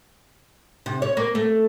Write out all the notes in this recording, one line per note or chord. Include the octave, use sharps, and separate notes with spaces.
C3
C#5
A#3
A3